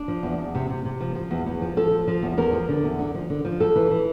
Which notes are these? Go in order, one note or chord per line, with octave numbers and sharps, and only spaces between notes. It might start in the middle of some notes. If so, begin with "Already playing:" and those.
Already playing: D4
F3
E2
E2
C3
C3
C3
F3
F3
E2
E2
F3
F3 A4
F3
F3
E2
E2 A#4
F3
D3
E2
D3
F3
D3
F3
F2 A4
E3
E3